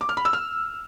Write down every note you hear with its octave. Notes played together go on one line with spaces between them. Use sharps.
D6
F6
B5
E6
F6